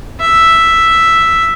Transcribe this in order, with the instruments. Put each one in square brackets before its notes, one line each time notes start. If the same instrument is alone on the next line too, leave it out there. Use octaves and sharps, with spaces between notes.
[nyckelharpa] E5